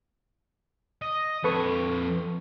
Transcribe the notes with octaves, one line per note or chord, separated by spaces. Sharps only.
D#5
F2 A4 B4 C#5 C#6